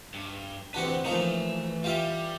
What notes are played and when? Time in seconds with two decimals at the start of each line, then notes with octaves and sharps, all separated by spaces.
0.14 G2
0.74 D3 E3 C4 D4 F#4 G4 B4 F#5
1.05 E3 F3 A3 A#3 D#4
1.84 G3 F4 G4 E5